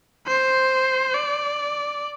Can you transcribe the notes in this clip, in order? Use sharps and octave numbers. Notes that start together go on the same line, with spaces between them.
C5
D5